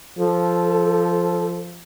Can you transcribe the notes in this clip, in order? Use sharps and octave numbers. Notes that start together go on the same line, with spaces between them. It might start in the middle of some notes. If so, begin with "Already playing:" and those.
F3 A4